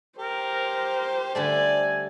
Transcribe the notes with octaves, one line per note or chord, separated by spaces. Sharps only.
G4 A#4 C5
D3 G3 A3 D5 G#5